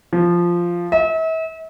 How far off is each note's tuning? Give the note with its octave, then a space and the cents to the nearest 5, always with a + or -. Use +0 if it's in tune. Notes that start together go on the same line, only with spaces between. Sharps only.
F3 -5
E5 -40